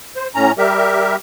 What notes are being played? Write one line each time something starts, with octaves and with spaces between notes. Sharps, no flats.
C5
A2 C#4 A#5
G3 G4 A#4 E5